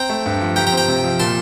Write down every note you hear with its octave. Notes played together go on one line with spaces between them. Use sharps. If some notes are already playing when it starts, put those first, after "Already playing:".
Already playing: C4 G5 A#5
A3
G2
F3
G4 G5 A#5
G5 A#5
C4
G5 A#5
C3
F3
A#2 A5 C6